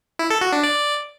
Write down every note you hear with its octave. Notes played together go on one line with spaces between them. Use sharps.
E4
A4
F#4
D4
D5